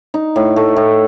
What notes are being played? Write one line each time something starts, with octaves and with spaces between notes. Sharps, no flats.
D#4
A2
A3
A2